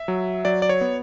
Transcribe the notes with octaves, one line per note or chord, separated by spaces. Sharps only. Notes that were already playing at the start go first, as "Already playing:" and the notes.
Already playing: E5
F#3
F#3 D5
D5
C#5
B3